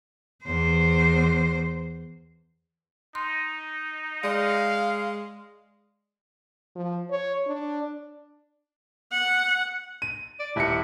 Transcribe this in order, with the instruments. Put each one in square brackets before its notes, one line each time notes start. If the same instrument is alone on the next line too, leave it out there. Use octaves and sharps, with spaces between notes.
[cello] E2 C5
[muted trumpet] D#4 [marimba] C6
[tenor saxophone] G#3 [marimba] D5 [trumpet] F5
[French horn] F3
C#5
D4
[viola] F#5
[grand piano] D#7
[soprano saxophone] D5
[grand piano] D#1 C#7 [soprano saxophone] E4